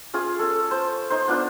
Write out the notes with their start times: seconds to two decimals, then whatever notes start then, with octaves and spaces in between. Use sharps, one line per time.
0.14 C#4 F4 G#4
0.39 C#4 A4
0.71 C5
1.10 D#4 C5
1.28 B3 D4 F4